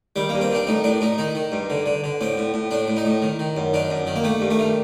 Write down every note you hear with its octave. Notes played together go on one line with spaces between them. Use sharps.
D#3 G3
G2 A#3
C4
D#3 D4
A2 D#4
A2 D4
A2 D#4
D#3 D#4
D#3
G2
D3
D3
D3
A2 C4
A2
A2
A2 D4
A2
D#4
A2
D#3
D#3
F#2
D#3 D4
F#2
D#3
A#3
D#3 A3
G2
A3
D#3